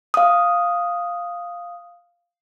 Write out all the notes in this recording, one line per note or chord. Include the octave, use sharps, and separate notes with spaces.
F5 D#6